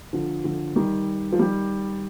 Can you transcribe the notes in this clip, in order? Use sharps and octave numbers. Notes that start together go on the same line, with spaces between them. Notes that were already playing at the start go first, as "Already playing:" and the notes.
D3 F3
D3 F3
D#3 G3
F3
D#3 G3